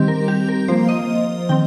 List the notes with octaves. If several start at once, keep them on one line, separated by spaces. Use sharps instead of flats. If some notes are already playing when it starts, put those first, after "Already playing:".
Already playing: D#3 G3 C4 G4
A#4
G4
A#4
F3 A#3 C5
D#5
D#3 C4 G5